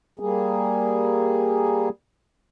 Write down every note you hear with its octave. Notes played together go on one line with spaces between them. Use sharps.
G3 A#3 G#4